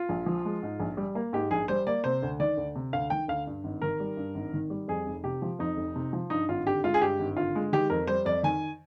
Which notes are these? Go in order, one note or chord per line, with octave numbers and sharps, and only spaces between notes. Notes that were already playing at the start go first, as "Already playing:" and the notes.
Already playing: F4
A#1
F3
G#3
G#2
A#1
G3
A#3
G#2 G4
A#1 G#4
G3 C5
A#3 D5
C3 C5
D2
D#3 D5
D2
C3
D2 F5
D#3 G5
D2 F5
G2
G#1
D#3 A#4
G3
G2
G#1
D#3
G3
F2 G#4
F1
C3 G4
F3
F2 D#4
F1
C3
F3
G2 D#4
G#1 F4
D3 G4
G#3 F4
G#4
G2 G4
G#1
D3 F4
G#3
D#3 G4
F2 A#4
G3 C5
F2 D5
D#3 G#5